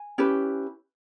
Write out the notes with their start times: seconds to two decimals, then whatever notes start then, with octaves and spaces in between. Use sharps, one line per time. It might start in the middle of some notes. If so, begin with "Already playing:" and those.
Already playing: G#5
0.18 C#4 E4 G4 B4